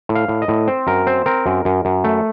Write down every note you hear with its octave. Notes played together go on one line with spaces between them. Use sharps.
A2
F5
A2
D#5
A2
C4 C5
F#2 A#4
C4 C5
C4 A#4
F#2
F#2
F#2
A3